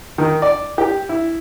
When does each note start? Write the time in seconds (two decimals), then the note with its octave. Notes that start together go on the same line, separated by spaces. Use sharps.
0.18 D#3
0.42 D5
0.78 G4
1.09 E4